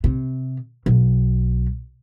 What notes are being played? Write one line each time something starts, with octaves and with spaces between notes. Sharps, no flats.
C3
B1